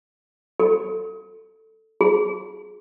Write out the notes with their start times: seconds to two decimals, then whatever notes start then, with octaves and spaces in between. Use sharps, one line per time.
0.60 A4
2.01 G#4